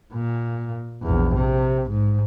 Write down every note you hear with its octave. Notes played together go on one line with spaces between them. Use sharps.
A#2
A#1 E2
C3
G#2